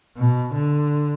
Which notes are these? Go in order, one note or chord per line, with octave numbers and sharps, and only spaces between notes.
B2
D3